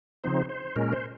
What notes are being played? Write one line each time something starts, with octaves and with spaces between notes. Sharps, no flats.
C#3 F3 C4 D#4 C5
C5
A#2 G#3 C#4 A#4
C5